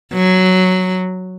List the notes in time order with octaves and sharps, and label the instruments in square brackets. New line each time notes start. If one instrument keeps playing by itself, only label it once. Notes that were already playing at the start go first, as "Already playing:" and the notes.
[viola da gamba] F#3